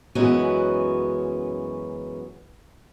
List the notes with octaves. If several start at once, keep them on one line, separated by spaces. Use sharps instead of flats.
F#2 E3 G#3 B3 C#4 F#4